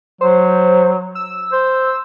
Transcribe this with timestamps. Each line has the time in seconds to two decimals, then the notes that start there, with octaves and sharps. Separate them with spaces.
0.21 F#3 C5
1.15 E6
1.52 C5